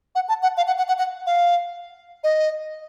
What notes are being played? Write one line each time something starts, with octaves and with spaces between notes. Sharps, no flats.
F#5
A5
F#5
F5
F#5
F#5
F#5
F#5
F5
D#5